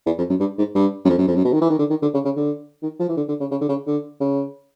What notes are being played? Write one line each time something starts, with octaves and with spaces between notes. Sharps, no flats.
E2
F2
F#2
G2
G#2
G2
F#2
F2
F#2
F2
F#2
B2
D#3
E3
D#3
D3
D#3
D3
C#3
C#3
D3
D#3
F3
E3
D3
D3
C#3
C#3
D3
C#3
D3
C#3